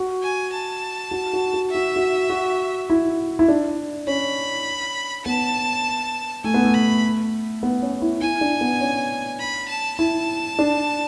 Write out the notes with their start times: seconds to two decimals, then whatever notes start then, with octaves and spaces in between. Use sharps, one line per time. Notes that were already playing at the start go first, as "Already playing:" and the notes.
Already playing: F#4
0.23 G#5
0.53 A5
1.11 F#4
1.33 F#4
1.54 F#4
1.71 F#4 E5
1.96 F#4
2.30 F#4
2.90 E4
3.39 E4
3.48 D4
4.07 C#4 B5
5.25 B3 A5
6.44 A3 G#5
6.54 B3
6.65 A3
6.74 B5
7.63 B3
7.82 C#4
8.02 E4
8.21 E4 G#5
8.41 D4
8.61 B3
8.81 C#4
9.40 B5
9.69 A5
9.99 E4 A5
10.59 D4